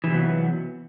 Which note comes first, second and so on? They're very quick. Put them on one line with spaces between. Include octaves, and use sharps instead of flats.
E3 C3 F#3 B3